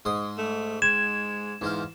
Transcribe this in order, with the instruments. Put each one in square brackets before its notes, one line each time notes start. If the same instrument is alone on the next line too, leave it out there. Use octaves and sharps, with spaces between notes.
[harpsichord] G#2 C6 D#6
[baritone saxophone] A3
[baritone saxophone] G#3 [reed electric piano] G#6 [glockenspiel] E7
[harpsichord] E2 C5 F5 [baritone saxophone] G#2